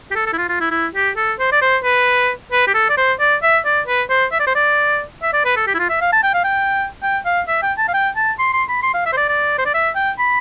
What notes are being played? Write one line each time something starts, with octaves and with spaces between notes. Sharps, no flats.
G4
A4
A4
E4
F4
F4
E4
E4
G4
A4
C5
D5
C5
B4
B4
G4
A4
D5
C5
D5
E5
D5
B4
C5
E5
D5
C5
D5
E5
D5
B4
A4
G4
E4
F4
E5
F5
A5
G5
F5
G5
G5
F5
E5
G5
A5
F5
G5
A5
C6
C6
B5
C6
F5
E5
C5
D5
D5
C5
D5
E5
G5
B5